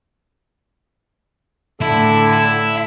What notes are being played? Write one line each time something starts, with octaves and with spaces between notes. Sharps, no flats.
A2 D3 E4 A4